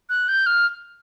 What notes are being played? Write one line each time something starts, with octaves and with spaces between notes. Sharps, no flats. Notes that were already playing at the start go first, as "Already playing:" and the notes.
F#6
G6
F6